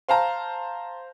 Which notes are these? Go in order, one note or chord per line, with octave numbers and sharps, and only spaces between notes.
C5 F5 A5 A#5